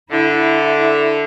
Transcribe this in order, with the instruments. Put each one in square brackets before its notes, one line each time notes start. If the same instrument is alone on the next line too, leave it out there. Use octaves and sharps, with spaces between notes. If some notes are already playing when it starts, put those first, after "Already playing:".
[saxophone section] D3 [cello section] E4